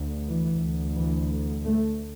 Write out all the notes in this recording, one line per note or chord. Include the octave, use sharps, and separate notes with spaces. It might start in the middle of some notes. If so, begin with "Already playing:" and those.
Already playing: D2
E3
D2
E3
A3